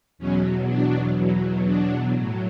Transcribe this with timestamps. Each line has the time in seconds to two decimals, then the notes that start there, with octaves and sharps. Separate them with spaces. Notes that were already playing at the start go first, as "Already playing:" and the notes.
0.18 E2 B2 F#3 C#4
0.68 D4
1.16 E2 B2 F#3
1.65 D4
2.13 A2 F#3